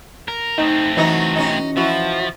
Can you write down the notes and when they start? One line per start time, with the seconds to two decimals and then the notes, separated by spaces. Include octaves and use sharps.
0.28 A#4
0.58 A3 C4 D#4
0.97 E3 F#3 D#4 A#6
1.36 C#4 D#4
1.77 F3 E4 F#4